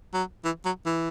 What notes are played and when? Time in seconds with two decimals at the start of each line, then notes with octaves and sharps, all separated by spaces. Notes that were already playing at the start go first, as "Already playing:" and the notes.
0.14 F#3
0.45 E3
0.65 F#3
0.86 E3